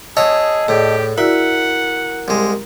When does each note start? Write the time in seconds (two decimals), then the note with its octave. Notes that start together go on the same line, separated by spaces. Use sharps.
0.17 G#4 C#5 D#5 F#5 A5 E6
0.68 A2 G4 G#4 D5
1.18 E4 F#4 A#4 D5 E5 F#5
2.28 C2 G#3